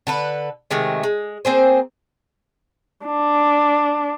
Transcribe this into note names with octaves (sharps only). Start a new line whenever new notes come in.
D3 A4 B4
C3 D#3 G#3 A3
G#3
A#3 C4 G#4 C5
D4